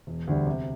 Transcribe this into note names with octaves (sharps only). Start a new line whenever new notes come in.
E1
D2 D3 G3
C3